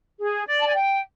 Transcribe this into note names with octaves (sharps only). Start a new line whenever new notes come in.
G#4
D5
A5
G#5
G5